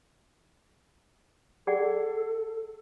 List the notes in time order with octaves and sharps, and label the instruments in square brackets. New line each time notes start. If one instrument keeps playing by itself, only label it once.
[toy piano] G#4 D5 F#5 [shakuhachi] A4